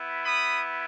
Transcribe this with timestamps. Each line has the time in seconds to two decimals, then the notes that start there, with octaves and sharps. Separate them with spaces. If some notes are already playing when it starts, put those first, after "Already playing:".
Already playing: B3 E4
0.25 B5 D#6